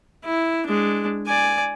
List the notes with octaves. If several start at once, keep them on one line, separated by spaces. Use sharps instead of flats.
E4
G#3 D4
D5 G#5